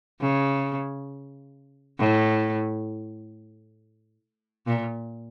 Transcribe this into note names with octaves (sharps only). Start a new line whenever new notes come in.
C#3
A2
A#2